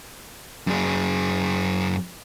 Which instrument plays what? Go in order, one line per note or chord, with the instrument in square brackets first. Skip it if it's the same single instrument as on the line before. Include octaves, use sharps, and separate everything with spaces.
[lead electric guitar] F#2 G#4